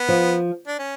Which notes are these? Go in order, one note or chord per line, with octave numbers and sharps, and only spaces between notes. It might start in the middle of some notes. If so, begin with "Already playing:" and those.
Already playing: B3
F3
D4
C#4